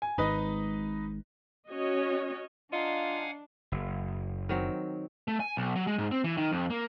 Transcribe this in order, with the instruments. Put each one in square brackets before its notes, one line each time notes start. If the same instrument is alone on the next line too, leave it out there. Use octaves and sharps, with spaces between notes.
[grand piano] G#5
[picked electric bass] G#1 G#2 [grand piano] D#4 B4 D#5
[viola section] C#4 F#4 C#5 D#5
[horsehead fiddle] D4 [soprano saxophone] F4 [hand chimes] D#5 A#5 [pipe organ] F5 F#5 G#5
[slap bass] F#1
[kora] D#3 F#3 C4
[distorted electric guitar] A3
G#5
B1
F#3
G#3
G#2
C4
E3
D#3
F2
A#3